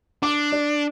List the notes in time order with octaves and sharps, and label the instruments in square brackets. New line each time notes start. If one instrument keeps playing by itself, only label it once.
[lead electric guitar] D4 [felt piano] D6
[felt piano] D5